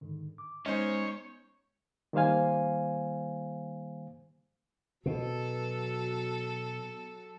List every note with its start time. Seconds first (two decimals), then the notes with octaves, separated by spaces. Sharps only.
0.01 G#2 D3 D#3
0.38 D6
0.66 G#3 B3 C#4 D#4 C5 C#5 D#5
2.13 D#3 G3 A#3 C5 F5 G#5
5.06 B2 F#3 A4